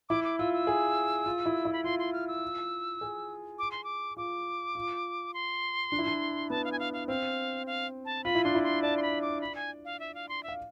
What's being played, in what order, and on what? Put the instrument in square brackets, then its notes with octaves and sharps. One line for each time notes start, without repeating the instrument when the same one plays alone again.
[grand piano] E4 [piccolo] D6
[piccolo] D6
[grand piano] F4 [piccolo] E6
[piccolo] E6
[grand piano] G#4
F4
E4
E4
[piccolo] B5
[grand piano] F4 [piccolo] C6
[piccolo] C6
F6
E6
[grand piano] G#4
[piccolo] D6
C6
D6
[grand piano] F4 [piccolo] D6
[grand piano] F4
[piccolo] C6
[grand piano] D4
E4
D4
[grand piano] B3 [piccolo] A5
[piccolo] F5
G#5
F5
F5
[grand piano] C4 [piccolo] F5
[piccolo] F5
A5
[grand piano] F4 [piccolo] B5
[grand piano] E4
[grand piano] D4 [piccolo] C6
[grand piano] E4
[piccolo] C6
[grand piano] D5 [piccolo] A5
[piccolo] C6
B5
D6
B5
G#5
F5
E5
F5
C6
[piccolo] E5 [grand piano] F5